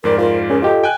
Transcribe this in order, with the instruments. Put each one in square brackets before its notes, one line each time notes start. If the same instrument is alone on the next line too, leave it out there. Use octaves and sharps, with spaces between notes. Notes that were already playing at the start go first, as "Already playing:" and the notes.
[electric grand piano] F2 G#2 D5 [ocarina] A#4
[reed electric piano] F4 [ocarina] A#4
[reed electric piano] C#4 G#4 [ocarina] A#4
[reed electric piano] F4 G4 A4 [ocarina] D#5
[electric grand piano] G5 G#5 F#6